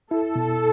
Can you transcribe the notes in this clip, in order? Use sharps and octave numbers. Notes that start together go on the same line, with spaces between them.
E4 A4
B2